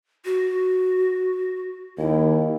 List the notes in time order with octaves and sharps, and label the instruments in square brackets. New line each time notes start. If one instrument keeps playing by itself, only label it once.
[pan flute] F#4
[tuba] D#2 [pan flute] E4